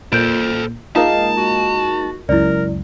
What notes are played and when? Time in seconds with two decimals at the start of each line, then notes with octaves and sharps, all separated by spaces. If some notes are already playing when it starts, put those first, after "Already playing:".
0.13 A#2 A4 C5 G6 D7
0.96 G#3 A#3 D#4 F4 A#4 D#5 F5 A5
1.38 F#4
2.29 C#2 F#2 E4 A#4 D5